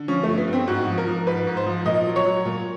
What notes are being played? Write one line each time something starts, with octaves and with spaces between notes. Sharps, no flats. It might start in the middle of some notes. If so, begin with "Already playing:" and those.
Already playing: D3
F3 C#4
G2 A3
B3
G2 C4
G#2 F#4
F3
A#4
F3
G#2 B4
G#2
C5
F3
A#2 D#5
F#3
C#5
F#3
A#2